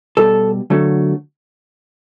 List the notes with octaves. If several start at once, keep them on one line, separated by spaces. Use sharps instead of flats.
B2 G3 A4
D3 F#3 A3